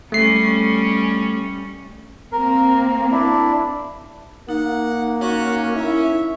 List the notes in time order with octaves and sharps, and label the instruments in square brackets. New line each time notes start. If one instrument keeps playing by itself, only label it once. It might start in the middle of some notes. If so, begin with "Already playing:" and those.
[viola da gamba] G3 C#4 [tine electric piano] A3 C7
[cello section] A#3 C4 [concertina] A#4
[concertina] D4 E4
[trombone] A#3 [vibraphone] D#4 [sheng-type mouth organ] F#5
[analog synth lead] C#4 [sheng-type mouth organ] F#4 F#6
[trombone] E4 [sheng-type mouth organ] E5